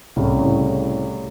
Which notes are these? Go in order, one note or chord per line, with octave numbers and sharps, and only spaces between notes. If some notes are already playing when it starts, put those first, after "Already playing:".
C2 A2 C#3